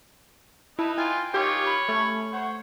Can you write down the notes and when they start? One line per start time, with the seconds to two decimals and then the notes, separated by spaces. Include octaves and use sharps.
0.79 D#4 E4 B4 A5
0.98 F4 G5 G#5
1.34 D#3 F4 G4 C#5 D6
1.66 B5
1.89 A3 C#4 C#6
2.32 C5 C#5 F#5